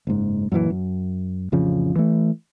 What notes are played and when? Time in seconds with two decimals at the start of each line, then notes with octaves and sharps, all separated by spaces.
0.07 F#1 G#2
0.52 F#2 A#2 D#3 E3
0.70 F#2
1.52 A1 F2 C#3 F3
1.96 E3 A3